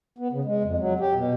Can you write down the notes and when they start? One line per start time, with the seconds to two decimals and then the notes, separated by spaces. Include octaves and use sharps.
0.18 B3
0.32 C#3
0.45 G#3
0.64 F2
0.78 F#3
1.00 G4
1.15 B2